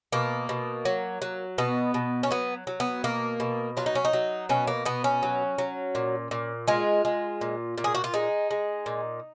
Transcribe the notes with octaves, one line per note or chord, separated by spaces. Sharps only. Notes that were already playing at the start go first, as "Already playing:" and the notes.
B2 A#3
B2
F#3
F#3
B2 B3
B2
C#4
F#3 B3
F#3
B3
B2 A#3
B2
F#3 F4
D#4
C#4
D#4
F#3
B2 C#4
A#3
B2 B3
C#4
F#3
F#3
A#2
A#2
G#3 F4
G#3
A#2
A#2
G#4
F#4
F4
G#3 D#4
G#3
A#2